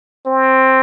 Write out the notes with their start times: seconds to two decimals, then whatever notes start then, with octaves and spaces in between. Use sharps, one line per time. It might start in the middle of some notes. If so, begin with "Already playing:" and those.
0.26 C4